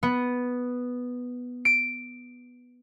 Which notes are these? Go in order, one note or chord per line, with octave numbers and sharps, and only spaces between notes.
B3
D7